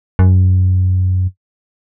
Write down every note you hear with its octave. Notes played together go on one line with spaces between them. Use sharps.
F#2